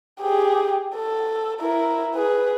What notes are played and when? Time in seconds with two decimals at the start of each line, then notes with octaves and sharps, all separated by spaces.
0.21 G4 G#4
0.96 A4
1.61 E4 A#4
2.15 G#4 B4